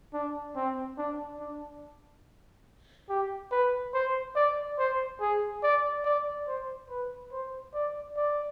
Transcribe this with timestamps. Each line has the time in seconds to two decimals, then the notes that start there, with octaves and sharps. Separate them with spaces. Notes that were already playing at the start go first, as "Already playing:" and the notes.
0.14 D4
0.56 C4
0.98 D4
1.40 D4
3.09 G4
3.52 B4
3.94 C5
4.36 D5
4.79 C5
5.21 G#4
5.63 D5
6.05 D5
6.48 C5
6.90 B4
7.33 C5
7.74 D5
8.17 D5